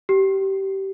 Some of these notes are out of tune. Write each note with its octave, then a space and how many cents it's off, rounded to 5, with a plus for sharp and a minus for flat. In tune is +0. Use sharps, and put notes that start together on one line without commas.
G4 -20